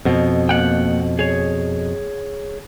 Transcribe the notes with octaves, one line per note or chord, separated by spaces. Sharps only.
F2 B2
A#3 F#5 G5
G#4 C#5